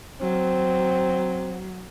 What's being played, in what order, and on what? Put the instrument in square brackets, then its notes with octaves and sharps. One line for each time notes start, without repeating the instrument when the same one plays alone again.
[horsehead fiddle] F#3 [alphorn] C4